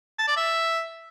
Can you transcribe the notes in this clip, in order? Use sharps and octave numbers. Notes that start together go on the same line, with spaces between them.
A5
D5
E5